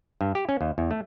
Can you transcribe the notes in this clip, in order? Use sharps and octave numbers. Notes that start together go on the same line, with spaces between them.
G2
G4
C#4
D#2
E2
A3